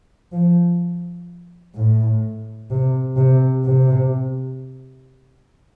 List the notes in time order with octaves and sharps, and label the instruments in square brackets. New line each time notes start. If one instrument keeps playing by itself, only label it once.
[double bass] F3
A2
C3
C3
C3